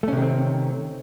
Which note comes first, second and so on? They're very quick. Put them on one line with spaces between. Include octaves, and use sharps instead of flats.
A3 C#4 C3 D#3 C4